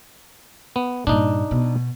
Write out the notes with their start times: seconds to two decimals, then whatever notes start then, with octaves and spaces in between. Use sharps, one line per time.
0.76 B3
1.07 G2 A#2 D4 D#4
1.51 B2